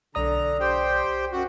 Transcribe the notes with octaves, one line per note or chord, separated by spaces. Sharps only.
B1 D3 D5 A#5 D#6
G4 C5 G5
F#2 F#4